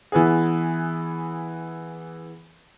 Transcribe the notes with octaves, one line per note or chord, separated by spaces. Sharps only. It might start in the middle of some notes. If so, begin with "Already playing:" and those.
E3 B3 G#4